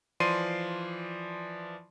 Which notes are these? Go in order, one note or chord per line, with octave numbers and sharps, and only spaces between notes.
E3 F3 D5 C6 C7 D#7